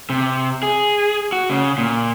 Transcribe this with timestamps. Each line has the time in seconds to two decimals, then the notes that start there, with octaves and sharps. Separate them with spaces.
0.10 C3
0.63 G#4
1.32 F#4
1.50 C#3
1.78 A#2